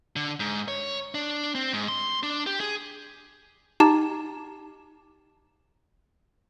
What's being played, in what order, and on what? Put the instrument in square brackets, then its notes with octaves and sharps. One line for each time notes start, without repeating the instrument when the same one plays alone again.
[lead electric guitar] D3
G#2
C#5
D4
C4
G#2
C6
D4
G4
G#4
[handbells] D#4 G4 A5